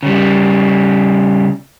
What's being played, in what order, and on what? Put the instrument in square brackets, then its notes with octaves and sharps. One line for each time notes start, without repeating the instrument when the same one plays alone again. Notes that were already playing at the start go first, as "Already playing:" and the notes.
[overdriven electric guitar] C#3 G3